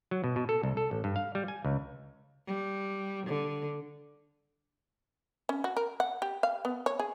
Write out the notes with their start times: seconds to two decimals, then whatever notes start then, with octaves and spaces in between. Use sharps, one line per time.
0.11 F#3
0.24 B2
0.36 B2
0.49 A4
0.63 C2
0.77 A4
0.91 A1
1.04 G2
1.16 F5
1.35 G3
1.48 G#5
1.65 C#2
2.47 G3
3.27 D3
5.49 C#4
5.64 F#4
5.77 A#4
6.00 F#5
6.22 G4
6.43 F5
6.65 B3
6.86 C#5
6.99 G#4